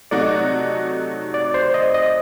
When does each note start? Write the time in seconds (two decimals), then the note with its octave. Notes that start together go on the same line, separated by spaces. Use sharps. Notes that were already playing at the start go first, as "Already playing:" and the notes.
0.11 C3 F#3 A3 D#4 F#4 D5
1.34 D5
1.54 C5
1.74 D#5
1.94 D#5